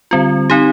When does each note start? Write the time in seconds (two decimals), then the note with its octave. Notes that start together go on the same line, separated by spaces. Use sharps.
0.11 D3 G3 C4 F4
0.50 C4 D#4 G4